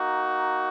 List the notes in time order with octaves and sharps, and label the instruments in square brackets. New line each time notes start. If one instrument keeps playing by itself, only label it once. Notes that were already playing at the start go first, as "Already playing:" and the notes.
Already playing: [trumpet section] A#3 D#4 F#4